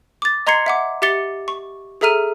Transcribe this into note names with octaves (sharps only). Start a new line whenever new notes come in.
D6 A6
D#5 A#5 C6 G#6 C7 C#7
E5 F#5 D6
G4 E5 D6 A6 C#7 G7
C#6
G#4 A4 E5 A#5 F6 D#7